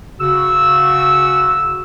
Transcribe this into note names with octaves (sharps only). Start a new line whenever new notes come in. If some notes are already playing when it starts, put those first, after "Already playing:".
C#3 F#4 E6